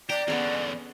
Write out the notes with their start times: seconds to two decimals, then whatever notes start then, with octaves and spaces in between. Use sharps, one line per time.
0.09 G4 D5 A#5
0.28 E2 D3 B3 C#4 G#4